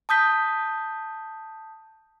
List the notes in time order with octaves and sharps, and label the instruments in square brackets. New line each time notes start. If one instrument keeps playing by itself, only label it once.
[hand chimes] A5 D#6 G6 B6